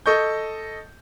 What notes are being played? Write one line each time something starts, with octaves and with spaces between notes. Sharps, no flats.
A4 D#5 C#6 G6